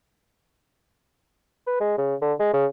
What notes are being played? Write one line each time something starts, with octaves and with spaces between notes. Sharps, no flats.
B4
G#3
C#3
D3
G#3
C#3